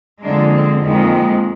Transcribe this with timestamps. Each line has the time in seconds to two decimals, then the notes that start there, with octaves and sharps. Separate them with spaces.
0.22 F2 D3 G#3 A#3 D4
0.52 C4
0.82 F2 D#3 G#3 A#3